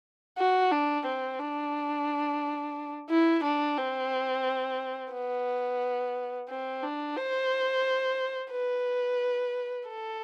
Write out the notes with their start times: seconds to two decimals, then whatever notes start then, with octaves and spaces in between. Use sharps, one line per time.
0.38 F#4
0.71 D4
1.05 C4
1.39 D4
3.09 E4
3.44 D4
3.77 C4
5.13 B3
6.49 C4
6.83 D4
7.17 C5
8.52 B4
9.88 A4